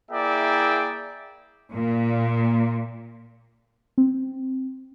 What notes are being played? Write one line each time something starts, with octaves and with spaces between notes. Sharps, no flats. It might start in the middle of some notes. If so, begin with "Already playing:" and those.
A#3 E4 G#4 D5 E5 G5
A#2
C4